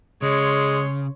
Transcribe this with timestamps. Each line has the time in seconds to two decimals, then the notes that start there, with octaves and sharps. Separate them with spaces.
0.22 C#3 G#3 C#5 C6